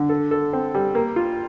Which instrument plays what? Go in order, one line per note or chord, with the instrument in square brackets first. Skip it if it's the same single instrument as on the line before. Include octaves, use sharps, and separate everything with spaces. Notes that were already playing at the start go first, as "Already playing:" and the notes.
Already playing: [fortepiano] D3
A4
A4
C4
G3
A#3
F4